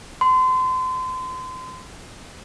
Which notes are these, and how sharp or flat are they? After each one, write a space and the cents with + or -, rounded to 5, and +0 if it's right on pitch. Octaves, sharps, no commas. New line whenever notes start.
C6 -35